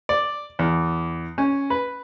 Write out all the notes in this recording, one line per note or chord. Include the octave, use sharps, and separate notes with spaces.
D5
E2
C#4
B4